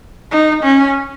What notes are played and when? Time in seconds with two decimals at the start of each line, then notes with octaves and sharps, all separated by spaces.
0.31 D#4
0.63 C#4